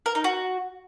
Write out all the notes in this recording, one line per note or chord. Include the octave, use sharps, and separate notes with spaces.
A#4
D#4
F#4